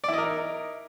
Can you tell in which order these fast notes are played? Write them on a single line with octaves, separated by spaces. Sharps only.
D5 E4 D#5 A#4 D#4